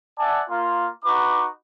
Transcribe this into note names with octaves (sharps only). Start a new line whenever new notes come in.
D5 E5 F#5 G#5 A5
A#3 F4
D#4 F#4 B4 D6